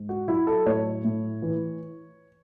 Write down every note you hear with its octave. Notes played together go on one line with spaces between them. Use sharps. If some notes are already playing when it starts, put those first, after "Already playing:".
Already playing: G#2
F#4
F#3 E4
A4
A2 C#5
A2
E3